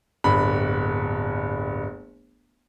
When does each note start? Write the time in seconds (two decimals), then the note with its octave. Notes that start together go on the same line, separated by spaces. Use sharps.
0.24 D1 G1 B5